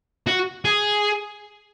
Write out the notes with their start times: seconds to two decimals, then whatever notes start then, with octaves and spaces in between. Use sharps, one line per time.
0.27 F#4
0.65 G#4